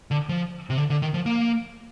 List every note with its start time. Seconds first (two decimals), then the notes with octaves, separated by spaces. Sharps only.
0.11 D3
0.29 F3
0.70 C3
0.77 D3
0.90 D3
1.02 D#3
1.14 F3
1.26 A#3